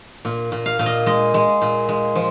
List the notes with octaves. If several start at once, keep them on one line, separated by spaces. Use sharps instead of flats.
A#2
A#2
F5
A#2 F5
D#5
G#3 D#5
G#3
A#2
G#3
F3